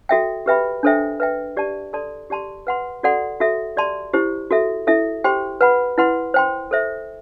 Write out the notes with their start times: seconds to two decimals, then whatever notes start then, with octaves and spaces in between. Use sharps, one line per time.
0.09 F#4 A4 E5 G5
0.46 G4 B4 E5 G5 B5
0.83 D4 A4 C5 E5 G5
1.20 B4 E5 G5
1.57 G4 D5 A5
1.93 A4 D5 A5 C6
2.30 G4 D5 A5 C6
2.67 B4 F#5 C6
3.03 F#4 A4 D5 F#5 C6
3.40 F#4 A4 E5
3.77 G4 D5 A5 C6
4.14 E4 G4 C5
4.51 F#4 A4 E5
4.87 E4 A4 E5
5.24 G4 C5 G5 C6
5.61 B4 F#5 B5
5.98 E4 B4 F#5 C6
6.34 C5 G5 C6
6.71 A4 C5 E5